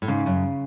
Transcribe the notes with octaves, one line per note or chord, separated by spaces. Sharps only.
A2
G#2 C#3
F#2